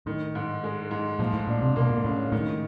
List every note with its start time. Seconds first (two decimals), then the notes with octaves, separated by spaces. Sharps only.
0.06 A2 D#3
0.35 G#2
0.64 G#3
0.91 G#2
1.19 A#2 F3
1.33 A2
1.47 A#2 D4
1.62 C3
1.76 B2 A#3
1.90 A#2
2.04 A2 C#3
2.32 A2 D#3